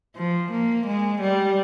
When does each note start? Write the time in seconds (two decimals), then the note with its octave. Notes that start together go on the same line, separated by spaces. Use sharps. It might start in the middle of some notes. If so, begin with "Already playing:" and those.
0.16 F3
0.51 A#3
0.86 G#3
1.21 G3